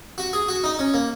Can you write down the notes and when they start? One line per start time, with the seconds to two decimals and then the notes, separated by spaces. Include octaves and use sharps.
0.18 F#4
0.33 G#4
0.48 F#4
0.64 D#4
0.79 C#4
0.94 A#3